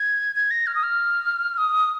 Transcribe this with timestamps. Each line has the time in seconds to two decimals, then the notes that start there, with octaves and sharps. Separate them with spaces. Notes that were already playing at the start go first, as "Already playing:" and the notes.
Already playing: G#6
0.36 G#6
0.51 A#6
0.67 F6
0.75 D#6
0.83 F6
1.57 D#6